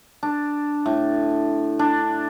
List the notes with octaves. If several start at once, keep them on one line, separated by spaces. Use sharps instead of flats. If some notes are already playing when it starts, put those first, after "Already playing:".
D4
A2
D4